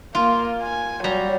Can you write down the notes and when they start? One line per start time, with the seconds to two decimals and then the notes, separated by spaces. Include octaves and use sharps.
0.15 A#3 F4
0.62 G#5
1.04 F#3 G3 A#5